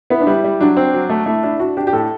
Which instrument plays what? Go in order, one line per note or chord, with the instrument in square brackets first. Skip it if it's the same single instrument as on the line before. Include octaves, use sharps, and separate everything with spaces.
[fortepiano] B3 [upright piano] E4
[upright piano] D4
[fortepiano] G3 [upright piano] E4
[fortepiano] G3
[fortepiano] F#3 [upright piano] D4
[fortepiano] C4
F#3
A3
[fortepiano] A3 [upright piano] E4
[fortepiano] D4 [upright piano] E4
[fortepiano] D4 [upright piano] F#4
[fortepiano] D4 [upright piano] G4
[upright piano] G4
[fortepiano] A2 [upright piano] A4